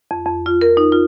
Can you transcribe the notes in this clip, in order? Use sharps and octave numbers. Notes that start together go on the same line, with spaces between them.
F2
F2
F4
A#4
D#4
F4